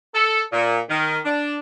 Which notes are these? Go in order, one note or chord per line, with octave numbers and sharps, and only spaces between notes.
A4
A#2
D#3
D4